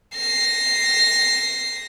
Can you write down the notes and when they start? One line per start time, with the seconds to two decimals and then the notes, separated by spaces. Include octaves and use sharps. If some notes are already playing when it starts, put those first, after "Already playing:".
0.15 A#6 C7